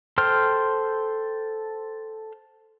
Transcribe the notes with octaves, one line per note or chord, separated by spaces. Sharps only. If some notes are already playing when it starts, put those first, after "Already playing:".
A4 C5 G5 C6 F6